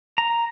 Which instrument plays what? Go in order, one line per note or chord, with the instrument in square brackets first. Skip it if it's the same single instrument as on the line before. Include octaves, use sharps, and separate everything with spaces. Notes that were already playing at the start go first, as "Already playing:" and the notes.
[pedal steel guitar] A#5